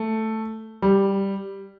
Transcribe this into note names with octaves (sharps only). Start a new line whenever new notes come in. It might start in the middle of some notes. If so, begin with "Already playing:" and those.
Already playing: A3
G3